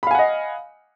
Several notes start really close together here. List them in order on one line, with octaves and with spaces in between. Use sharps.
B5 F5 G#5 F#5 D#5